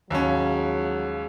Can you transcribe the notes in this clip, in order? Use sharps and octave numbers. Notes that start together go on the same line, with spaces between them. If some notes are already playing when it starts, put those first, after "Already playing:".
D#2 G#2 C#3 F3 F#3 C#4